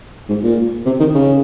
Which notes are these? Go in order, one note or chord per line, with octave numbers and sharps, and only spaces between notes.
G#2
A#2
C3
D#3
C#3